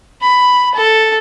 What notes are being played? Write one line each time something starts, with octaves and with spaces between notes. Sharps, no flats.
B5
A4